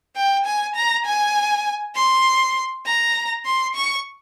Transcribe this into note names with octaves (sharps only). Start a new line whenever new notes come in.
G5
G#5
A#5
G#5
C6
A#5
C6
C#6